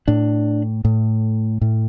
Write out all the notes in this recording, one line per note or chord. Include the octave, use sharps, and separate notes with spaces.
A2 D4
A2
A2